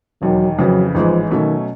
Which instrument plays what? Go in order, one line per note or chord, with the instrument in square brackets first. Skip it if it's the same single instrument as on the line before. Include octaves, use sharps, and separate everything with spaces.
[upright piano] E1 D#2 D#3 [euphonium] F#3
[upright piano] F2 C#3 E3 [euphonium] F#3
[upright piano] A1 G#2 E3 G#3 [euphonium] F3
[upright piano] B2 F#3 A3 C#4 [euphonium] D#3